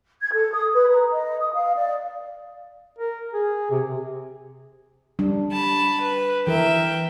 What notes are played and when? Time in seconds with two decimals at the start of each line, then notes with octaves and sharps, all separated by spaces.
0.21 G#6
0.33 A4
0.53 D#6
0.73 B4
0.90 A#5
1.10 D#5
1.39 D#6
1.53 F5
1.75 D5
2.99 A#4
3.33 G#4
3.71 C3
5.19 G3 D4
5.51 A5 B5
6.02 B4
6.47 E3 A#4 E5 G5